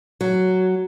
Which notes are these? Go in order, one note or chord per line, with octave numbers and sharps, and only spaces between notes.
F#3